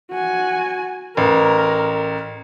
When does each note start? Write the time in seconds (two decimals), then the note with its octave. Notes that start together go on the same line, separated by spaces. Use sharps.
0.11 F#4 G#5
1.17 A1 A#4